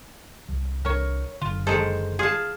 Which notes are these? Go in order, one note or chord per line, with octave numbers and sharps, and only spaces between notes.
C2
C2 D4 A#4 C#5
F#1 D3 F4
D#3 G#3 A4 C5
F4 G#4 F5 A5